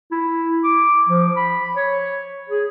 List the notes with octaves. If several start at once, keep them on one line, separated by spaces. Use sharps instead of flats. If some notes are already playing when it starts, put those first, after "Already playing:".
E4
D6
F3
B5
C#5
G#4